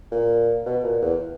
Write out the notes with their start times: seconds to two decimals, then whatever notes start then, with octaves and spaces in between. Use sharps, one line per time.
0.12 A#2
0.66 B2
0.84 A#2
1.02 E2